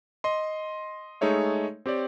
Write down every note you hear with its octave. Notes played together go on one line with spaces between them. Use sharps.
D#5 C6
G#3 A3 D#4 G#4 C#5 E5
C4 G4 C#5 D5